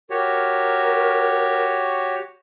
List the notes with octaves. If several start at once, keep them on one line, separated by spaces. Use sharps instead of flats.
F#4 G4 A#4 C#5